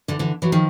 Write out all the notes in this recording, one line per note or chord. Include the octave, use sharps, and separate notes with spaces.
D3 E3
D3 E3
E3 F#3
D#3 F3